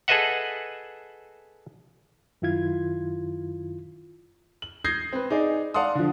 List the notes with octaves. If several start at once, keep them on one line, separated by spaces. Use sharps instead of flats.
G#4 A4 B4 D#5 E5 F#5
F#2 D#3 E4 F4 G#6
F#7
D#6 G6 G#6 A#6 C7
C4 B4
D#4 G#4 D5
D5 F5 F#5 A5 C6 D#6
D3 F3